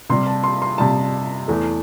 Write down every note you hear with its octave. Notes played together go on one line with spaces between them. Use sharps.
C3 G3 C6
A5
C6
C6
C3 G3 A5
E2 E3 A3